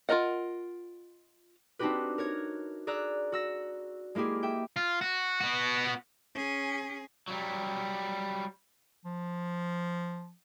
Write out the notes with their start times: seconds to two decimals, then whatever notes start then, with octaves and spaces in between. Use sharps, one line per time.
0.09 F4 A4 A#4 D#5 F#5
1.79 C4 D4 D#4 F#4 G4 B4
2.18 A#4 C#5 G#6
2.87 G#4 D5 A#5 E6 F#6
3.32 F#4 E6 A#6
4.15 G#3 A#3 E4 G4 G#4
4.43 E5 G5
4.76 F4
5.01 F#4
5.41 B3 F#4
6.35 C#4 G#4
7.28 F#3 G3
9.05 F3